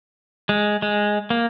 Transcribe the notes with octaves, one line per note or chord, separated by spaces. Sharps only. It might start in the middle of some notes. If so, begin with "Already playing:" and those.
G#3
G#3
A#3